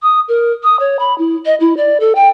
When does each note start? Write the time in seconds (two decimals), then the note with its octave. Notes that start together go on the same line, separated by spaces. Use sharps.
0.02 D#6
0.28 A#4
0.63 D#6
0.80 C#5
0.99 B5
1.18 E4
1.46 D#5
1.60 E4
1.77 D5
2.00 A4
2.15 G5